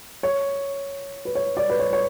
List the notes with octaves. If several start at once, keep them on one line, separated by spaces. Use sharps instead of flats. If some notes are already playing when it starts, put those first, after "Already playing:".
C#5
B4
C#5
D5
B4
C#5
C#5